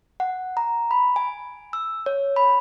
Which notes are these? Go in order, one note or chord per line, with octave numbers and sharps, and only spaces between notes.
F#5
A#5
B5
G#5
E6
C#5
B5